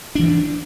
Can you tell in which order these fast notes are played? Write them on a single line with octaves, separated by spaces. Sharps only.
D4 E3 F3